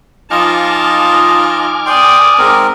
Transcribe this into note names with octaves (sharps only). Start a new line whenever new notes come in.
F3 D#4 F4 D#5 G#5 A5 D6 F6
D5 G5 C6 D#6
G#2 C4 A#4